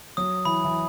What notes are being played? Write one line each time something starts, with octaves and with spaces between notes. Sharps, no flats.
F#3 D#6
E3 B5
E3